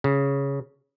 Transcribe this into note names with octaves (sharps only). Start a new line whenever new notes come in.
C#3